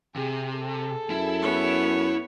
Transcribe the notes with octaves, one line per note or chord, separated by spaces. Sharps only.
C3 G#4
G#4 A4
F#2 E4 E5
B3 C#5